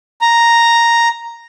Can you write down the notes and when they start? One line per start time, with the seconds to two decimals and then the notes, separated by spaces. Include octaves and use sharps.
0.21 A#5